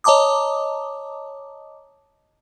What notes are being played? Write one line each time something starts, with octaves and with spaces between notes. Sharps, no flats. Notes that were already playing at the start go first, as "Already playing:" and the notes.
C#5 D#5 A5 A#5 D6 D#6